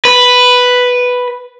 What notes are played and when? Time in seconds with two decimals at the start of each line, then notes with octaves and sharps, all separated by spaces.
0.05 B4